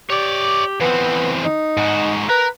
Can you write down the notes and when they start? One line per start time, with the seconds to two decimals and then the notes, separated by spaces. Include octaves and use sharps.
0.10 G4 C#5 D5
0.81 E2 B3 C4
1.45 D#4
1.77 G#2 F#4
2.29 A#4 B4 A#5